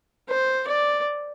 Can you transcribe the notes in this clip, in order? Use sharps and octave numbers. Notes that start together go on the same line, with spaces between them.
C5
D5